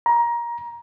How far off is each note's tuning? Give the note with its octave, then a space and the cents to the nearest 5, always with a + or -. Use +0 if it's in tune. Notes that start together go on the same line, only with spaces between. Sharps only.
A#5 +20